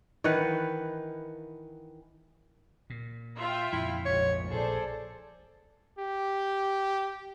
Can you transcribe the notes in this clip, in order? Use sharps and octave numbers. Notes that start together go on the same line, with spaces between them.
D#3 E3 B4 F#5
A#2
F4 E5 G5
F2 A#2 C#3 E4
A#1 G#2 C#5
A#1 G#4 A4 C5 D5
G4